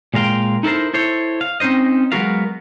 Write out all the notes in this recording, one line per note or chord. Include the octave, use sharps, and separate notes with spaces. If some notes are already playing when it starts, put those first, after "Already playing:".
A#2 G#3 A#4 F5 G5 C6
D#4 E4 A4 A#4 C5
E4 A4 C5 C#5
F5
C4 C#4 D#4 C5 D#5
F#3 G#3 B3 F#4 A#4 F5